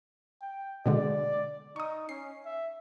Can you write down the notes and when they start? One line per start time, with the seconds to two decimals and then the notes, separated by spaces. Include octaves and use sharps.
0.41 G5
0.86 B2 D3 G#3 D5
1.76 D#4 C#6 D#6
2.09 C#4 C7
2.46 E5